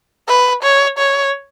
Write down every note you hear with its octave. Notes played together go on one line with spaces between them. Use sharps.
B4
C#5
C#5